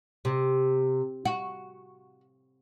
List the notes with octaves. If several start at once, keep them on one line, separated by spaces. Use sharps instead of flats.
C3
F#4